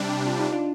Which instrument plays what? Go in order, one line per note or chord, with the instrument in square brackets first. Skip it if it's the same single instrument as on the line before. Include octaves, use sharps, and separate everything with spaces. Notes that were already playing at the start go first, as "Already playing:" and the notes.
Already playing: [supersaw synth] C3 G3 D4
[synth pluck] F4
D#4
D4 F4